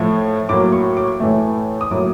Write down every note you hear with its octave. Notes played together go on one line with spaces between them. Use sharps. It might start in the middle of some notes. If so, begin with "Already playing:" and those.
Already playing: A2 F3 A3
A2 F#3 A#3 D6
C#6
D6
A2 E3 A3
D#6
A2 F#3 A#3 D6